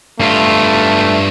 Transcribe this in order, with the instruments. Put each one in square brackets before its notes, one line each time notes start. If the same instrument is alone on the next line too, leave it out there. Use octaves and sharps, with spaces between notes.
[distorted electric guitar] G2 F4 [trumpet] A3